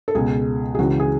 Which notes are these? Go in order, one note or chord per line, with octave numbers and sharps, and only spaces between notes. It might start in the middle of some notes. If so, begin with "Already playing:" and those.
A4
C#2 B2 G#4
G#4
C#2 C#3 E3 F#4
G#4